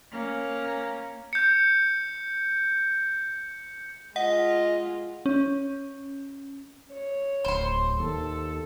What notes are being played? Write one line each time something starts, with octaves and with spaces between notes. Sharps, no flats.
A#3 C#4
G6 C#7
G#3 F4 D#5 F#5
C#4
C#5
D1 C5 C6
D#2 A4